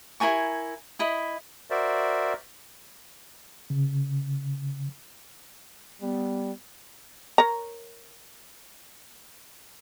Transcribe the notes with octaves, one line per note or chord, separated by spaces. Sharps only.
E4 A#4 G#5 C#6
E4 D#5 B5
F#4 A#4 C5 D5 E5
C#3
G3 B3
A#4 C#5 A#5